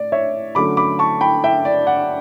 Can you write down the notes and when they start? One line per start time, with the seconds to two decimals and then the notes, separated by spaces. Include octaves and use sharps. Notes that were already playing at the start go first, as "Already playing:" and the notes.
Already playing: A2 D5
0.12 C#5 E5
0.55 D3 F#3 A3 C#4 B5 D6
0.77 B5 D6
0.99 A5 C#6
1.21 G5 B5
1.44 E5 G5
1.65 D5
1.87 D5 F#5